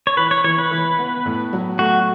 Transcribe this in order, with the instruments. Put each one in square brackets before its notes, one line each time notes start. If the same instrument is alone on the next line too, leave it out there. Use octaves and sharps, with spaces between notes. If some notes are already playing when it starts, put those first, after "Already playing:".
[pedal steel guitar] C#5
[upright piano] E3 [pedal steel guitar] B4
[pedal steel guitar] C#5
[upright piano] E3 [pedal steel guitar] C#5
[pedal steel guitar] B4
[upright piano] E3
B3
A2
F#3
[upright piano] A3 [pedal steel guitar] F#4